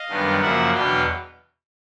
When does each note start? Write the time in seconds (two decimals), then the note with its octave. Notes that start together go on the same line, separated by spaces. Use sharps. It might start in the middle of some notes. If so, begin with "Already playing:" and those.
Already playing: D#5 F5
0.09 F#2 D#3 G3 B3 D4
0.41 F#2 C#3 F3 A#3 E5 F#5
0.73 E2 B2 F#3 B3 D4 F5 G5